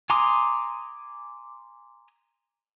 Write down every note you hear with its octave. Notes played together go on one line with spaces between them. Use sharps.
G#5 A#5 C6 D6 D#6